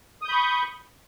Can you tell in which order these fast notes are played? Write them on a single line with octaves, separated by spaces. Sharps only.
D#6 G6 B5 C#6